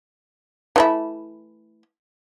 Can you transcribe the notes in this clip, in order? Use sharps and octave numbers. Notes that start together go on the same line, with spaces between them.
E3 A3 E4